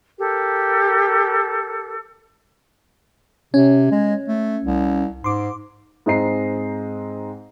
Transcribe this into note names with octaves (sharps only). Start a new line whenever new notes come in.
G4 A4 A#4
C3 C#4
G#3
A3
C2
G#2 C6 D6
G#2 G#3 C4 D#5 A#5 C7